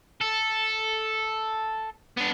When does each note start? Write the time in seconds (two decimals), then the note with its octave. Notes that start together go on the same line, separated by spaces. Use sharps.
0.21 A4
2.17 B3 D4